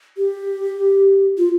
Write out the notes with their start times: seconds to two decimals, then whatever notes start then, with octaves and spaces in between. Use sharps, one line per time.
0.17 G4
1.38 F4